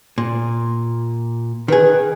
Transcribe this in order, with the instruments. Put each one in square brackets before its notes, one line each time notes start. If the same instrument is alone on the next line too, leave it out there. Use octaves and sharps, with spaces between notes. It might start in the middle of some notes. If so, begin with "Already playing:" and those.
[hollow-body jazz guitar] A#2
[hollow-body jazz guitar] D#3 G#4 [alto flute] B4